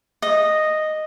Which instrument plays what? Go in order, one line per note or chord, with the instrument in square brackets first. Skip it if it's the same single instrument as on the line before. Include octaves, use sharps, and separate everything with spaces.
[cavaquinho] D#5